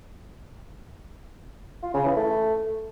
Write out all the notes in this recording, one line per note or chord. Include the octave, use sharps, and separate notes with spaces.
F4
C#3
E3
A3